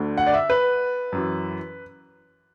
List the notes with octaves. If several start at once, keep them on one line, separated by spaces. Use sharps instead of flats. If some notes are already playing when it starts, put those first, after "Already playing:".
Already playing: D2 D3
F#5
D5
E5
B4
F#2 E3